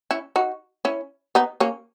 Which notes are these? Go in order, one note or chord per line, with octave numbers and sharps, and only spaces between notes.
C#4 E4
D#4 F#4
C#4 E4
B3 D#4
A#3 C#4